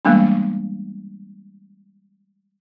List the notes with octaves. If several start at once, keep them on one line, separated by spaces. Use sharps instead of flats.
E3 G3 G#3 A#3 B3 D4